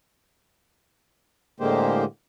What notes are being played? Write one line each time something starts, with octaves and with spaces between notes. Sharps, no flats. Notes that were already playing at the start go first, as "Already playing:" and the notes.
A2 D3 G#3 A#3 G4 C5